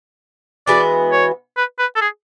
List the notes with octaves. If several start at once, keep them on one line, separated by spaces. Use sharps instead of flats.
E3 G#3 B3 F#4 D5
C#5
B4
B4
A4
G#4